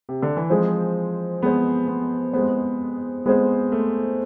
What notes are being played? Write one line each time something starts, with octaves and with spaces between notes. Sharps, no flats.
C3
D3
E3
F3 G#3 C4 G#4 C5
G#3 B3 C4 G#4 C5
B3
G#3 B3 C4 G#4 C5
G#3 B3 C4 G#4 C5
A3